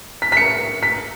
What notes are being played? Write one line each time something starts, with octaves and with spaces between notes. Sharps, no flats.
B6
B6
C#7
B6